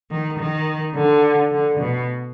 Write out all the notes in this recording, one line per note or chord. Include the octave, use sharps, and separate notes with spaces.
D#3
D#3
D3
D3
B2